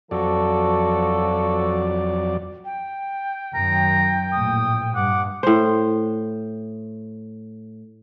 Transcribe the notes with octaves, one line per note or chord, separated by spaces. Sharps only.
F2 F3 F#3 F#4 A4 D5
G5
F#2 D#3 A#5
A#1 A2 D#6
G2 F#5 D6
A2 C5